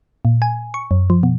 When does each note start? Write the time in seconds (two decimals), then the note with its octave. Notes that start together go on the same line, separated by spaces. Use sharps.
0.25 A#2
0.42 G#5
0.74 C#6
0.91 F#2
1.10 F3
1.23 B2